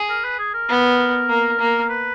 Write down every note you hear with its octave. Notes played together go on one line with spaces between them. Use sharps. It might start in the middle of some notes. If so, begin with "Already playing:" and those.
Already playing: G#4
A#4
B4
G#4
A#4
B3
A#3
A#3
A#4
B4